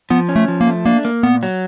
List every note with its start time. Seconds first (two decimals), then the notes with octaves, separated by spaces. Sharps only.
0.10 F3 B3
0.29 C#4
0.36 A3
0.48 F3
0.61 A#3
0.66 A3
0.85 A#3 D4
1.05 A#3
1.23 A#2 B3
1.43 F#3